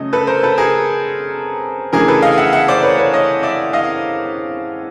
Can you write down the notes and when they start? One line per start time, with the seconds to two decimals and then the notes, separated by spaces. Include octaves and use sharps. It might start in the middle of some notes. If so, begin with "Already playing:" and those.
Already playing: C#3 F#3 A3 C#4 D#5
0.13 A4 B4
0.27 A#4 C5
0.43 A4 B4
0.58 G#4 A#4
1.93 C#3 E3 A3 D4 G#4 A#4
2.08 A4 B4
2.22 D#5 F5
2.37 E5 F#5
2.53 E5 F#5
2.68 C5 D5
2.82 B4 C#5
2.98 B4 C#5
3.13 C#5 D#5
3.43 D5 E5
3.73 D#5 F5